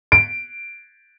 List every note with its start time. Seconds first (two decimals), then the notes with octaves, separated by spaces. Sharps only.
0.12 D7